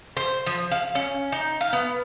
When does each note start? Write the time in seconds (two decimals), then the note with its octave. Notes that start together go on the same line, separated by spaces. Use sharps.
0.17 C5
0.46 F3
0.71 F5
0.95 C#4
1.32 D#4
1.61 F5
1.73 B3